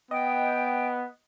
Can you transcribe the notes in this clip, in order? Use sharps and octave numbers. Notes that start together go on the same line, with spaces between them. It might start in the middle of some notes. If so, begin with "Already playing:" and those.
B3 D#5 G5